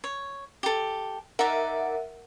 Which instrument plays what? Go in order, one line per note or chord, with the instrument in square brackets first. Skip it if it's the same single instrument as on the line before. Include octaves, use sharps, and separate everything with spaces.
[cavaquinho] C#5
G4 A4
[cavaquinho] D#4 D5 [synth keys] A#4 E5 F#5